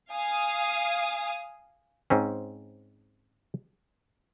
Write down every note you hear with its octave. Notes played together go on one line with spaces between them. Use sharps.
F5 G#5 D#6
G#2 C4 C#4